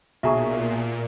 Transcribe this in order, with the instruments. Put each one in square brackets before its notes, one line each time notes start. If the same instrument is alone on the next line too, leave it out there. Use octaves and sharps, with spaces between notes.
[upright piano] B1 G#4 [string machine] A#2 [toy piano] E5 A#5 C#6